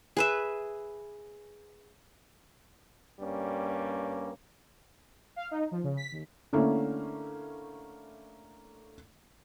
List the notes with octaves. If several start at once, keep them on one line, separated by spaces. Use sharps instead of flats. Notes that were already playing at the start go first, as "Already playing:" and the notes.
G#4 B4 E5
G2 G3 A#3 C#4
F5
D#4
F3
C#3
B6
D#2
D3 A3 A#3 C#4 E4